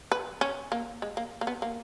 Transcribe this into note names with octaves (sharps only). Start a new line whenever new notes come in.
B4
C#4
A#3
G#3
A#3
A#3
B3
A#3